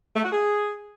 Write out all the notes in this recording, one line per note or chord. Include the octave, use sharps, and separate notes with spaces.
A3
F#4
G#4